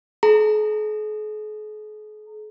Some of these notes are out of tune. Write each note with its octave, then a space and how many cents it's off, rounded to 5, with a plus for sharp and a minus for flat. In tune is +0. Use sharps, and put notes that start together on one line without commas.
G#4 +45 A#5 -30